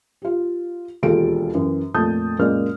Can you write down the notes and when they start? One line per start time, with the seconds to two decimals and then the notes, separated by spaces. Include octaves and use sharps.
0.22 F4 G4
1.03 E1 D#2 F4 G4 A4 D7
1.54 F#2 E3
1.94 F2 A#2 A3 A5 D#6 G6
2.39 F#2 A#2 G#3 A#3 D5 F6